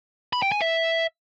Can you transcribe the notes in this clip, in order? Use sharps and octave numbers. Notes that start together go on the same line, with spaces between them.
B5
G5
G#5
E5